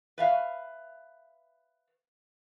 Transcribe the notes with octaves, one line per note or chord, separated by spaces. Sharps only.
B4 E5 F5